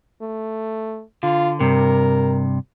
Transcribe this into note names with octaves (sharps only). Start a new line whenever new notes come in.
A3
D3 F4
G2 C3 A#4